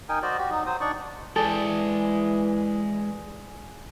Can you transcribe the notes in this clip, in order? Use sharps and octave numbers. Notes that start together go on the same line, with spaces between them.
D#4 A#4 G5 G#5
F#4 C5 D5 D#5
F#4 G4
F#3 D#4
F#3 C5 D#6
D4 D#4 D5 C#6
E3 G#3 G#4 A4 D5 G5